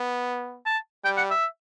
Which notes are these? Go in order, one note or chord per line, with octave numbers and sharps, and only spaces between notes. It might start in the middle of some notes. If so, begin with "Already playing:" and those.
Already playing: B3
A5
G3 G5
F#5
E5